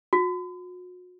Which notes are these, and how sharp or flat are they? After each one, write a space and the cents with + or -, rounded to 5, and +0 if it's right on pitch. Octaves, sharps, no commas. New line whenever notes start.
F#4 -40